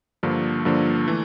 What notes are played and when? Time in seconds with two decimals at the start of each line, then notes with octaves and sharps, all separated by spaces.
0.23 G2 D3 F3 A#3
0.65 G2 D3 F3 A#3
1.08 E3 A3